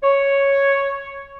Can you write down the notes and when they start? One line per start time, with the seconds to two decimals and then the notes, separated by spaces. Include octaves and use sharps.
0.03 C#5